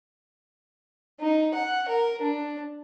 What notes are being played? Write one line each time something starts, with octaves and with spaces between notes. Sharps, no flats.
D#4
F#5
A#4
D4